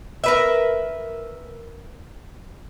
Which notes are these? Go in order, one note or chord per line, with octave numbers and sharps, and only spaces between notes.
A#4 B4 E5